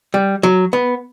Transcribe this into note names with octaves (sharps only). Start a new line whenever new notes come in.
G3
F#3
B3